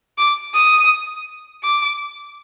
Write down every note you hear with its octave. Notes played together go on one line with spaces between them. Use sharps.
D6
D#6
D6